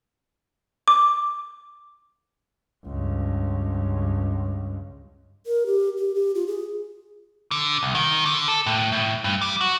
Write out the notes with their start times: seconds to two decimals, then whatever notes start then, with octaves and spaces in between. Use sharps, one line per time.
0.88 D6
2.86 C#2 G2
5.45 A#4
5.66 G4
5.97 G4
6.15 G4
6.35 F4
6.47 G#4
7.51 D3
7.83 C2
7.95 D#3
8.25 D3
8.48 A4
8.66 A2
8.92 A2
9.24 G2
9.42 G3
9.61 F#4